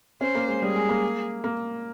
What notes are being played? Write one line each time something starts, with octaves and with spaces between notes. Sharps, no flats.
C#4 C5
A#3
G#3
G3 G#4
G#3
A#3
A#3